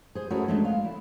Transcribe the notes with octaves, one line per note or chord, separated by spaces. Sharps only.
G#4 C5
A3 C#4 E4 F#4 G#4 A#4
G#3 A3 D4
F5
E4